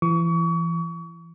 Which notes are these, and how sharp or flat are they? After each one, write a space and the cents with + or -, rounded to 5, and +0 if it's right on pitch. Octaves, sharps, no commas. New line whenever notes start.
E3 +30 C#6 +35